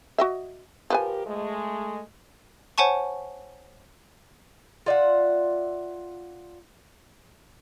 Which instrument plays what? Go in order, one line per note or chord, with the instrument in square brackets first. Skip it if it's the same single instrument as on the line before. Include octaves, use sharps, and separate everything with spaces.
[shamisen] F#4 D#5 E5
[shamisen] F3 B4 G#5 [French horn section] G4 A#4
[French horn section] G#3 A3
[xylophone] C5 C#5 F#5 G#5 A5 C#6
[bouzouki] F4 D5 E5 F#5